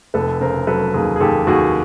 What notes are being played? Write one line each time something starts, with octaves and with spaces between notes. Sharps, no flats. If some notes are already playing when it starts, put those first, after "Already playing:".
F1 A4 B4
C#3 A#4 C5
F#3 A4 B4
D#2 G#4 A#4
G#4
D#2 G4 A4
D#2 F#4 G#4